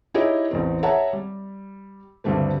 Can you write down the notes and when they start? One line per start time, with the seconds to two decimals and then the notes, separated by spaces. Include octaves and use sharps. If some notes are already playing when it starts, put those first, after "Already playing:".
0.14 D#4 E4 G4 G#4 C#5 D#5
0.51 A1 E2 C4
0.83 G#4 C#5 E5 F#5 A5 A#5
1.13 G3
2.24 D2 G2 C#3 G3 A3 C4